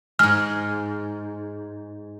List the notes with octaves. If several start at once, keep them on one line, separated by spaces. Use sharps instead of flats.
G#2 G#3 F6